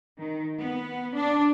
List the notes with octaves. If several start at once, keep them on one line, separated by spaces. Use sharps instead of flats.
D#3
B3
D4